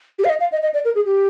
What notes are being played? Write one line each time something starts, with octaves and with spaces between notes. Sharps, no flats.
G4
F5
D#5
F5
D#5
D#5
D5
A#4
G#4
G4